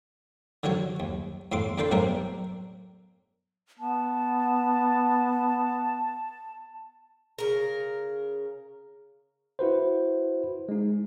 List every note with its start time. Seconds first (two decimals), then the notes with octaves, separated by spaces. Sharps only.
0.63 D3 D#3 F#3 F#4 C#5
1.00 D#2
1.52 E2 A2 C6 D6
1.78 E2 D4 A4 G5 C6
1.91 B1 A2 C3 D4 A#4
3.80 B3 A5
7.38 C#3 A#4
9.59 E4 F#4 B4 C5
10.69 G#3 D#4